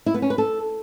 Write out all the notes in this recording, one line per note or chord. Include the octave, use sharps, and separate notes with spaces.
E4
B3
C#4
B4
A4